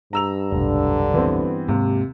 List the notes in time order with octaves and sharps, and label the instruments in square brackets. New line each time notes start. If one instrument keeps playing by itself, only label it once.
[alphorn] G2 [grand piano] A#5 E6 F7
[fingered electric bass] F1 B1 [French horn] D3
[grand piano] E3 B3 C4
[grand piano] D#2 C3 [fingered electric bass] G#2